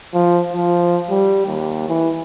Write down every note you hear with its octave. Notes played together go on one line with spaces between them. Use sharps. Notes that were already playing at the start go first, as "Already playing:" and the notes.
F3
F3
G3
D#2
E3